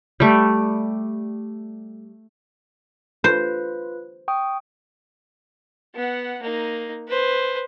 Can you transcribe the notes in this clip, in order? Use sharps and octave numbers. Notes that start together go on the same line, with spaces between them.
G3 A3
F4 B4 C5
G5 C#6 D#6
B3 F#5
A#3 D#4
B4 C5